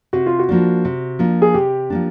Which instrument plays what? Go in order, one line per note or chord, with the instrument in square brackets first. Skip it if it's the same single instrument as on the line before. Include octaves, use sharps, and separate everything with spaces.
[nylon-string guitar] C3 [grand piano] F#4
[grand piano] F4
F#4
[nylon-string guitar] F3 A#3 D4
C3
F3 A#3 D4
[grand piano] G#4
[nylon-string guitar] C3 [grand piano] G4
[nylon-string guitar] F3 A#3 D4